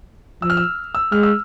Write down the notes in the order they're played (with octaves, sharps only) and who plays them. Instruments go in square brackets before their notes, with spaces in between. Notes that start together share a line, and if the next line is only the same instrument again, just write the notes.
[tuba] F3 [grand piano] E6
[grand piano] F6
E6
E6
[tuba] G#3 [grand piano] F6
[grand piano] E6